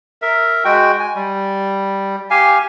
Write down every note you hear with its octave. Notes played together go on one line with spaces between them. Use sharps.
A#4 E5
G#3 F#4 G5
G#5
G3
G4 F5 G#5